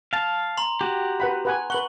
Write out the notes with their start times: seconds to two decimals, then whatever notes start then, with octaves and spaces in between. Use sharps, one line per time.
0.13 F5 A5
0.57 A#5 C6 F7
0.81 F#4 G4
1.20 B4 F#5 B5
1.45 B4 F#5 G#5
1.70 B4 F#5 C#6 F#7 G7